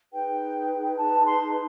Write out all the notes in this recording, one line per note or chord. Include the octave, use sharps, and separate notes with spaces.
D#4 G#4 B4 G5
A5
C6